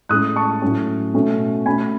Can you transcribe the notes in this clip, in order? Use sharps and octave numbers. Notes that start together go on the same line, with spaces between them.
A2 G#3 C#4 D#6 F#6
A5 C#6
A2 F#3 C#4
B2 A3 C#4
B2 A3 C#4 G#5 B5